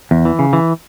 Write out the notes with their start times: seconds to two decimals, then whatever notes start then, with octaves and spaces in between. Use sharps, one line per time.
0.11 E2
0.25 E3
0.39 C#3
0.53 E3